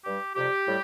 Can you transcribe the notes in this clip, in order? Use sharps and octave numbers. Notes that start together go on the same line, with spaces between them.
G2 G3 G4
F2 C3 G3 G4
A2 G3